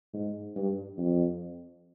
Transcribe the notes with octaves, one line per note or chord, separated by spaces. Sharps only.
G#2
G2
F2